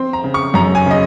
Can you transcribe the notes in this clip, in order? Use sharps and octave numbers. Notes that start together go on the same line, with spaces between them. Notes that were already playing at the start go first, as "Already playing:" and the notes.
Already playing: C4 C6
A#5
C#3
C#6
F#2 A#5
G#5
C#3 D#5